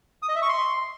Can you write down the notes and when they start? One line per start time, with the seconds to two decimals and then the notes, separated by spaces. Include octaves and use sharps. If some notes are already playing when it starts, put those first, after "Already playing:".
0.22 D#6
0.29 D#5
0.35 E5
0.42 C#6
0.49 C6